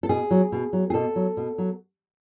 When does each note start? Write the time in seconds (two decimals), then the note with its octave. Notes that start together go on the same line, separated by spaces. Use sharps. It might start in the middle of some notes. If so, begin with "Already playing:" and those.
0.03 A4
0.09 B2 G#4
0.31 F#3
0.52 B2
0.73 F#3
0.90 G#4
0.94 B2 A4
1.16 F#3
1.37 B2
1.58 F#3